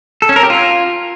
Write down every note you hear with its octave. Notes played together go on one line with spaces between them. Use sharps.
A4
C#4
A#4
G4
F4